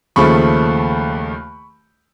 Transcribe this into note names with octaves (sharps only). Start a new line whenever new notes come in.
D#2 C#3 F3 A3 B5 C#6